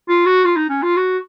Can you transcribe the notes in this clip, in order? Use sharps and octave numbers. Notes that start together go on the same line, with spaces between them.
F4
F#4
F4
D#4
C#4
F4
F#4